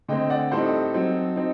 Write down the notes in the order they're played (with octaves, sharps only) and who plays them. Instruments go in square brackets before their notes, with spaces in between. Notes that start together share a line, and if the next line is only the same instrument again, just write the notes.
[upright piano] D3 A3 C4 D#5 G5
D5 F#5
A2 G3 C4 D#4 A4 C5
F#3 C4 D#4
C4 D#4